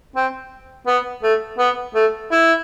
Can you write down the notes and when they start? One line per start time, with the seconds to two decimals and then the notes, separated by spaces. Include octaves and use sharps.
0.16 C4
0.87 B3
1.23 A3
1.59 B3
1.95 A3
2.32 E4